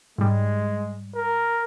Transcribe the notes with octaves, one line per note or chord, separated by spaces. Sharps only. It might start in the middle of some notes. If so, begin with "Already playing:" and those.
G#2 G3 G#3
A#4